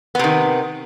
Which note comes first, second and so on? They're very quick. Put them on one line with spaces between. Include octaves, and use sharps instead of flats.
B3 C3 D#3